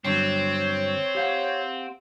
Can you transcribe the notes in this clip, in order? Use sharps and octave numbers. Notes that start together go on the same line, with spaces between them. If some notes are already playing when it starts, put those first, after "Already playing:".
G2 D3 F#3 C4 C#5
G4 F5 F#5